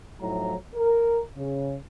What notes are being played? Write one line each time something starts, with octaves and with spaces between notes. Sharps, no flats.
A2 F3 F#3 D#4 E4 A#5
A#4
C#3